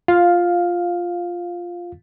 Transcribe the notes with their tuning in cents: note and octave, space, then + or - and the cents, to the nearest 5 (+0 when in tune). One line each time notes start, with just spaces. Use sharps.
F4 +0 F5 +10